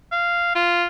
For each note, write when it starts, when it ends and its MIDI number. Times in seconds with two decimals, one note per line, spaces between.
0.12 0.50 77
0.55 0.86 65